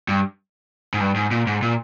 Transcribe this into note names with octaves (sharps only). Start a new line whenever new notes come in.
G2
G#2
G2
G#2
A#2
G#2
A#2